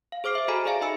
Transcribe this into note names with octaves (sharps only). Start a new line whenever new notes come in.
F5
G#4 C5 D6 F6 C7
C5 E5
F#4 A4 D#5 G#5 A#5 B5
G#4 D5 E5 F5 G#5 A5
D#4 D#5 E5 B5 E6 C#7